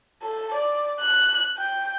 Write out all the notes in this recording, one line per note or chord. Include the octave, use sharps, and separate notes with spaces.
A4
D5
F#6
G5